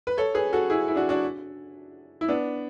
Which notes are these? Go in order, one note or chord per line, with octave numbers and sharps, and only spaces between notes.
B4
A4 C#5
G#4 B4
F#4 A4
E4 G#4
E4
D4 F#4
D4 F#4
E4
B3 D4